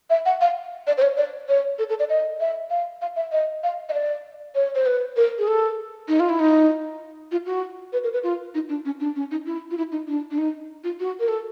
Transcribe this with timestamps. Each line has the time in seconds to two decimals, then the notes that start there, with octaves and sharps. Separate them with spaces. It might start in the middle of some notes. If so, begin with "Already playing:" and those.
0.10 E5
0.26 F#5
0.41 F5
0.87 D5
0.98 C5
1.02 C#5
1.17 D5
1.48 C#5
1.79 A4
1.89 A4
1.99 D5
2.09 D#5
2.40 E5
2.70 F5
3.01 F5
3.16 E5
3.32 D#5
3.63 F5
3.89 D#5
3.93 D5
4.55 C#5
4.75 C5
4.86 B4
5.17 A#4
5.38 G#4
5.48 A4
6.08 D#4
6.20 F4
6.29 E4
6.39 D#4
7.31 F4
7.46 F#4
7.93 B4
8.04 A#4
8.13 B4
8.23 F4
8.54 D#4
8.69 D4
8.85 C#4
9.00 D4
9.16 C#4
9.31 D#4
9.46 E4
9.71 F4
9.77 E4
9.92 D#4
10.08 D4
10.31 D4
10.38 D#4
10.84 F4
11.00 F#4
11.20 A#4
11.28 A4